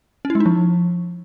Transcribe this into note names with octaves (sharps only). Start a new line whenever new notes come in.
C#4
E4
G#3
D#4
F3